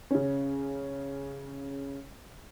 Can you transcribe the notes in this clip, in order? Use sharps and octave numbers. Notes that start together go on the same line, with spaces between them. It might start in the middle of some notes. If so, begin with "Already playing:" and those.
C#3 C#4